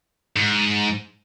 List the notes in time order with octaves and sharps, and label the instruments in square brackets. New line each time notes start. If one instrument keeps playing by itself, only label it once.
[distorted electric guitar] G#2